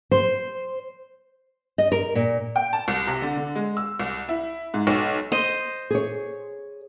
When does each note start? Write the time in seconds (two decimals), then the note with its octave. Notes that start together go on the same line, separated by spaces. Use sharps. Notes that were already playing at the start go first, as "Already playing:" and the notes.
0.12 C5
1.78 D#5
1.92 A#4
2.15 A#2
2.56 G5
2.73 A5
2.88 C2
3.07 C3
3.22 D3
3.37 D3
3.56 G#3
3.77 E6
4.00 C2
4.29 E4
4.74 G#2
4.87 B1
5.32 C5 D#5
5.90 G#4 C#5